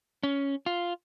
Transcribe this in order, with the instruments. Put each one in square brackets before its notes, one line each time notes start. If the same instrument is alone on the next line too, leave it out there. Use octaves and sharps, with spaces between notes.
[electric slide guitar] C#4
F4